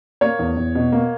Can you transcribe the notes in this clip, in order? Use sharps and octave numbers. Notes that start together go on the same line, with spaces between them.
A#3 C#5
E2
E2
B2
A#3